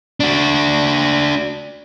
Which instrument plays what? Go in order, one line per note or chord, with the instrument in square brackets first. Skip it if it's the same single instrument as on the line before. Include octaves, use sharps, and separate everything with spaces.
[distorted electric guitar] D4 F#4